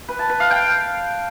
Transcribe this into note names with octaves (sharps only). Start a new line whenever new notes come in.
B4
A5
B4
F5
G5